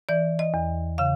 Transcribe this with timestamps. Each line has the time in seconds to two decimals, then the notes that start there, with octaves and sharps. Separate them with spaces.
0.09 E3 D5
0.39 D#5
0.54 E2
0.98 C#3 F5